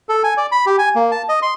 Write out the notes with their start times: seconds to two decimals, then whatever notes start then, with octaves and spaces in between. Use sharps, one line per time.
0.09 A4
0.24 G#5
0.37 D5
0.52 B5
0.66 G4
0.78 G#5
0.95 A#3
1.11 A5
1.29 D#5
1.42 C6